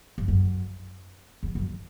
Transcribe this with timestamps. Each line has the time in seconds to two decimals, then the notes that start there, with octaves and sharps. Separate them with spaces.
0.18 G2
0.28 F#2
1.43 E2
1.55 F#2